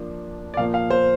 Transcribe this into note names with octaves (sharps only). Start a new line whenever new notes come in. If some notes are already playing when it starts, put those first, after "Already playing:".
Already playing: F3 A#3 D4
D5
A#2 F3 A#3 F5
F5
C5